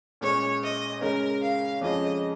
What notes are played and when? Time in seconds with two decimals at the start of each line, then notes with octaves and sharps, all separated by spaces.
0.21 A#2 G#3 C#4 C#5
0.62 D#5
1.01 C#3 G#3 C#4 A#4
1.41 F5
1.81 F2 C#3 G#3 C#4 F4 D#5